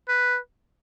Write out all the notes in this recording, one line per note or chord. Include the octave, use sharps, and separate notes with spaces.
B4